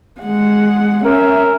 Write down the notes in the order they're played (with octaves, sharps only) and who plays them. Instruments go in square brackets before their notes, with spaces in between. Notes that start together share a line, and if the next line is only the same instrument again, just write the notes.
[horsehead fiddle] G#3 F#5
[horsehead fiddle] C#4 E5 [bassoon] A#4